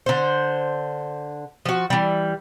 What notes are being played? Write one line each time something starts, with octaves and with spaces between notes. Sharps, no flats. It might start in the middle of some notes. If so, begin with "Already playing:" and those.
D3 C5
F3 F#4
E3 G3